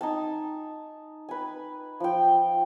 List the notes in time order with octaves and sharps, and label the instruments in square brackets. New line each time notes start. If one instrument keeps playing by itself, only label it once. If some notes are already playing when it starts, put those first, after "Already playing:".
[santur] D#4 G#5 A5
B4 G#5
F3 G5